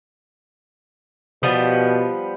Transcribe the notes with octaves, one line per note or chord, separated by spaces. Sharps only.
B2 F3 G3 B3